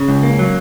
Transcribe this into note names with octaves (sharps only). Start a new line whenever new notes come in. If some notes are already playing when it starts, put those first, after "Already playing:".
Already playing: C#3
C#2
A#3
F#3